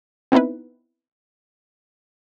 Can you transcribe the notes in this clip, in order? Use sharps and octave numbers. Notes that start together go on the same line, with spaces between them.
B3 C4 D#4 E4 B4